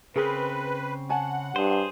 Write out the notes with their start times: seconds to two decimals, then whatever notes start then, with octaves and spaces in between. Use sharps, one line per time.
0.16 C#3 C4 G#4 A#4 B4 B5
1.09 C#5 F#5 G#5 A5
1.56 G2 G#4 C5